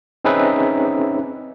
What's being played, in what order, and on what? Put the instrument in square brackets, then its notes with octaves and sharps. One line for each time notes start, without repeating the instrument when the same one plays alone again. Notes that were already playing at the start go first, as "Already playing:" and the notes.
[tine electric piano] C4 C#4 D#4 G#4 B4 E5